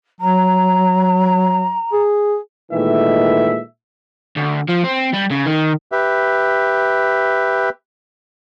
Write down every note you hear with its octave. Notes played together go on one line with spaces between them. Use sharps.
F#3 A#5
G#4
A#2 D#3 E3 G#3 A3 E5
D2
F3
C4
G3
C#3
D#3
G4 B4 E5